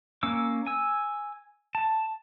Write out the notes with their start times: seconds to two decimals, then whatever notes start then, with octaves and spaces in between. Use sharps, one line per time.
0.23 A#3 C#4 D6 E6
0.67 G#5 E6
1.75 A5